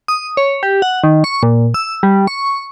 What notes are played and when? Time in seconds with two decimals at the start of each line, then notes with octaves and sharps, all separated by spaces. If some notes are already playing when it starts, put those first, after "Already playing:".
0.08 D#6
0.37 C#5
0.63 G4
0.82 F#5
1.04 D#3
1.24 C#6
1.43 A#2
1.74 E6
2.03 G3
2.27 C#6